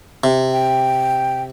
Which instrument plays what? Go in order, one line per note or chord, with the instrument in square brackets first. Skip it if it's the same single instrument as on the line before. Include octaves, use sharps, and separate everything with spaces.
[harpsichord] C3
[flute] G5